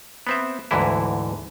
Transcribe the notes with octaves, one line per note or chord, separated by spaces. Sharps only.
B3 C4 E5
D2 G#2 D3 E3 E4